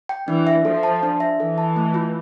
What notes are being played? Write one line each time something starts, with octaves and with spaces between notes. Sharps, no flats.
G5
E3 D4
E5
F3 A4
A5
D4
E5
E3 A4
A5
A3
F4